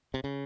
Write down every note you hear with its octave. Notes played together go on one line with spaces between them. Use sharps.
C3
C#3